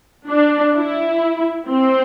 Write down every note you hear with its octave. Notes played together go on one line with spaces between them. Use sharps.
D4
E4
C4